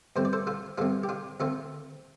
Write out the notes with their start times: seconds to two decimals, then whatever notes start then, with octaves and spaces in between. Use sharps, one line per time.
0.16 G2 D3 A3 C4 C5
0.25 D5
0.33 A4 C5
0.47 F4 A4
0.78 G2 D3 A3 C4 F4 A4
1.03 G4
1.09 D4 F4
1.40 D2 D3 A3 C4 F4 A4